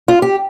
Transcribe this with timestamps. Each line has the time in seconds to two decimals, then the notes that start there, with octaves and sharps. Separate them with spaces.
0.08 F4
0.22 G4